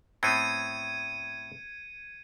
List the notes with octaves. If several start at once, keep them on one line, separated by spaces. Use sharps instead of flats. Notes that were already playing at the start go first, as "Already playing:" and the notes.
A2 B3 C4 G#6 C#7 D#7